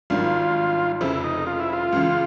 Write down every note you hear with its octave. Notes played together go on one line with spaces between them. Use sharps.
G#1 G2 D#3 F#3 F4
F1 F2 C#3 F3 E4
D#4
F4
E4
F4
C#2 C#3 E3